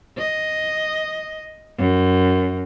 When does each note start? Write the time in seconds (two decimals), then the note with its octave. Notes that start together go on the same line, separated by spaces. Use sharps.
0.18 D#5
1.78 F#2